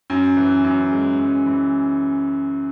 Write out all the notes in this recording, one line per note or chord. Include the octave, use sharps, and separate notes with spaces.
F#2
E3
F#2
G#3
F#2
E3